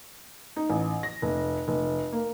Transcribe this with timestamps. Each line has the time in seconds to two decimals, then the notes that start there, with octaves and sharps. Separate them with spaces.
0.56 D#4
0.70 A1
1.03 A#6
1.22 F1
1.68 F1
2.12 A#3